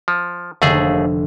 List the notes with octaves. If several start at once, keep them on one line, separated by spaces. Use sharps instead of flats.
F3
F1 D#2 D3 A3 G#4 E5